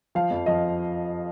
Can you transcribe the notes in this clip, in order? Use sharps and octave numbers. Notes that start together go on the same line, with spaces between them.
F3 F5
F2
F3 D#5